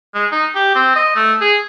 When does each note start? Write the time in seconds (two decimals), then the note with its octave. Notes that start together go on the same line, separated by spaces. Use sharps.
0.14 G#3
0.32 D#4
0.55 G4
0.75 C4
0.96 D#5
1.16 A3
1.41 G#4